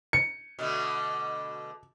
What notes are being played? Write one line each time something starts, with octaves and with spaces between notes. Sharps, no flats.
C#7
B2 D3 A3